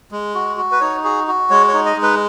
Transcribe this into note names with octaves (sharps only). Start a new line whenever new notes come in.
G#3
F#4
F#4
B4
D#4 C#5
F#4 G#4
F#4
G#3 C#5
C#5
D#4
D#5
G#3
B4